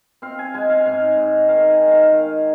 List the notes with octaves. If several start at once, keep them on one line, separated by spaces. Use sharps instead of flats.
C4 F5
G#5
G#3 G#5
F5
G#5
G#2 F5
G#2
D#3 F5
G#5
D#3
F5
D#3